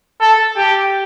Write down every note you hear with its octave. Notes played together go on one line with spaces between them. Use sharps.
A4
G4